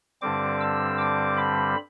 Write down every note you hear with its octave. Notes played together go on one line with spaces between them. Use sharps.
G2 D3 G3 C4 D6
E6
D6
B5